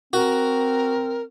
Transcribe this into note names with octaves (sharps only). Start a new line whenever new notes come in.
C4 F#4 A#4